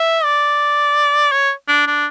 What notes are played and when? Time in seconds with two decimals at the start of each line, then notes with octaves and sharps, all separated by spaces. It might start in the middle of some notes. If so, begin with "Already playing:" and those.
Already playing: E5
0.23 D5
1.32 C#5
1.68 D4
1.87 D4